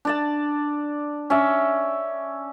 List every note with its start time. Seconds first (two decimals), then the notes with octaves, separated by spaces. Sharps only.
0.05 D4 D5 A5
1.30 C#4 D5 E5